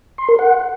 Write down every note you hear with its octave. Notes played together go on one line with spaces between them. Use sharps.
C6
A#4
F#5